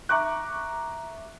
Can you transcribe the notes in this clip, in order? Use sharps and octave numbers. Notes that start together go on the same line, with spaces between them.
E5 A#5 C#6 D6 F#6